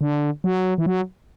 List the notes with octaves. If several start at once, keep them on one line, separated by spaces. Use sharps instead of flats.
D3
F#3
E3
F#3